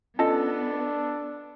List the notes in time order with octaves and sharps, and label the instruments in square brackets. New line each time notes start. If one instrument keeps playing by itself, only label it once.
[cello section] B3 [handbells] C#4 F4 D#5 [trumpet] D4 [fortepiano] A4